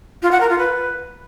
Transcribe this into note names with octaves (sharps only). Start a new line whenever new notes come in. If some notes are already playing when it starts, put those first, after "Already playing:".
F4
F#5
A#4
F4
B4